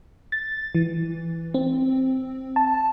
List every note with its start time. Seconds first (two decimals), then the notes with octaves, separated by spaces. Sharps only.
0.32 A6
0.75 E3
1.54 C4
2.56 A5